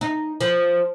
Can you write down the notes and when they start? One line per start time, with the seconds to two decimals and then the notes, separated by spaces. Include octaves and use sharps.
0.01 D#4
0.41 F3